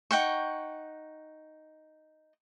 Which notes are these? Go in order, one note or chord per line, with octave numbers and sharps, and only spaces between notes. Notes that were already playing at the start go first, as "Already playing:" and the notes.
D#4 F#5 G5 C#6